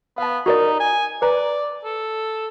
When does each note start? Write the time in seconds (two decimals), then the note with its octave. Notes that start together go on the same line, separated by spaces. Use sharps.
0.18 B3 F5 A5
0.46 D#4 F#4 A#4 D5
0.80 G#5
1.22 B4 D5 A#5
1.84 A4